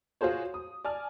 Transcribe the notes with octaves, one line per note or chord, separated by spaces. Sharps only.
F4 F#4 G#4 C5 C#5
D#6
D5 G#5 A5 F6